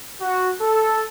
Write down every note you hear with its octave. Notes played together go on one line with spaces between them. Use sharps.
F#4
A4